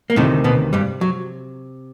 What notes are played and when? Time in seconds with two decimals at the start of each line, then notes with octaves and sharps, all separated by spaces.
0.10 A#3
0.16 D2 A2 C3 D#3 A3
0.44 B2 B3
0.73 G2 G3
1.01 F#3